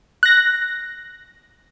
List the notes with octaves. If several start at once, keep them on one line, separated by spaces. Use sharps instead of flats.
F#6 A#6